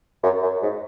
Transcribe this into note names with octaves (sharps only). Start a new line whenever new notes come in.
F#2
F#2
G#2